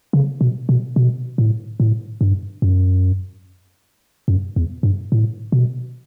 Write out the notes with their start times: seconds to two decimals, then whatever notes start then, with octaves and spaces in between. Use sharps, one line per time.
0.13 C#3
0.41 B2
0.69 B2
0.96 B2
1.38 A2
1.80 A2
2.21 G2
2.62 F#2
4.28 F#2
4.56 E2
4.83 G2
5.12 A2
5.52 B2